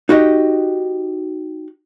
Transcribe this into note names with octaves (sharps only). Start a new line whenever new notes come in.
D#4 F#4 G4 D#5